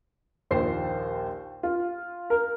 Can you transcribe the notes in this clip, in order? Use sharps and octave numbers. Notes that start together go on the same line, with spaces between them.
A#1 D#2 C5 C7
F4
A#4